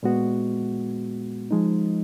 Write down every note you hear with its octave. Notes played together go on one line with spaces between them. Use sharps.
A#2 G#3 B3 F#4
F3 G#3 D#4